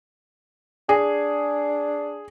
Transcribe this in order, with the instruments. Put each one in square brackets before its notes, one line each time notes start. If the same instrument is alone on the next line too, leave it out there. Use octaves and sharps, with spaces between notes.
[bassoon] D4 [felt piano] G#4